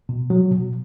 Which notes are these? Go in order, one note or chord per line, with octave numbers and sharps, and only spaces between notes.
B2
F#3
B2